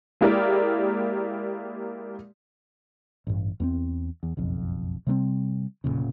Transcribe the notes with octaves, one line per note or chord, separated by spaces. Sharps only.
G#3 A#3 E4 G4 A#4 D5
A1 G2
E2 A3 C4
E2
F#1 B1 F2
C3 G3 A3 C4
F1 C2 A#2 C#3